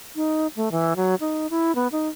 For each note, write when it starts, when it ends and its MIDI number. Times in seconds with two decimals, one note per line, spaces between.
0.16 0.47 63
0.56 0.72 57
0.72 0.94 52
0.96 1.15 54
1.20 1.47 63
1.50 1.75 64
1.75 1.88 59
1.92 2.08 63